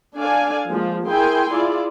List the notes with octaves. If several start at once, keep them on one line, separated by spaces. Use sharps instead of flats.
D4 A4 D5 F5 G#5
F3 G#3 A#3
E4 G#4 A#4 G5 G#5 C6
E4 F4 G#4 D5